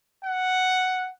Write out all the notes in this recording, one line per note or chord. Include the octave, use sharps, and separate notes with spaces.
F#5